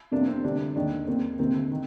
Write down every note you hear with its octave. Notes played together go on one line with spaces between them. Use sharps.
F2 C3 G3 A#3 D4
C4
D2 C3 G3 D4
D#2 D#3 G#3 D4
D#2 D#3 A#3 C4
D2 C3 D#3 A#3 C4
D#3